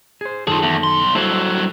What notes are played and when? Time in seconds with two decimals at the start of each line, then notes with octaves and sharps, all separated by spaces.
0.21 G#4 C5
0.47 F#2 D#3 F4 G#4 A4
0.63 E2
0.84 B2 C6
1.15 G2 F#3 E4 A4 C5